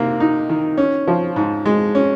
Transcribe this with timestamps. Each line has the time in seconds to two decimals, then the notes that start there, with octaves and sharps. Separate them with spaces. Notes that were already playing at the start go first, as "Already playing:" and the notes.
Already playing: C3 D#3 A#3
0.20 D#4
0.49 D#3
0.78 C#4
1.07 F3
1.36 G#2
1.65 G#3
1.95 C#4